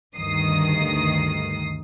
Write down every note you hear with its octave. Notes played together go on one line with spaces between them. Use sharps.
D2 G2 D#3 D#6 C7